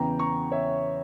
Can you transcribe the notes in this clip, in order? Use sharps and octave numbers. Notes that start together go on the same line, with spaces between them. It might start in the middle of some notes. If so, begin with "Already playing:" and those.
Already playing: E2 C#3 E3 G5 A#5
A#5 C#6
C#5 E5